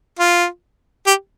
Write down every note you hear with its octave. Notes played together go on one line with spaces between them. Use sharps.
F4
G4